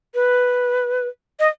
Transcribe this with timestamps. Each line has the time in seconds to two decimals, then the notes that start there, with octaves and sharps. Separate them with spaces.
0.15 B4
1.40 D#5